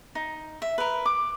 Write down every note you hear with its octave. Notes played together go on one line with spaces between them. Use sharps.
D#4
E5
A#4 B4
D6